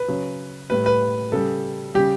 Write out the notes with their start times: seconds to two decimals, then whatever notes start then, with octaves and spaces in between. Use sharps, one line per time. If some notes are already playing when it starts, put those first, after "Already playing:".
Already playing: B4
0.08 C#3 F#3
0.70 A2 G3 B4
0.86 B4
1.32 C#3 G3 A4
1.94 C#3 G3 G4